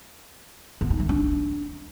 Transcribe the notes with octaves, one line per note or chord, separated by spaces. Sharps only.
B3
D#4
A3
D4